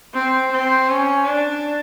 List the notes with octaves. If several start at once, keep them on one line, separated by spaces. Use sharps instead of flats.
C4
C4
C#4
D4